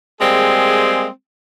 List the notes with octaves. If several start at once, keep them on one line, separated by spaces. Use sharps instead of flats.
G3 G#3 A#3 C4 G#4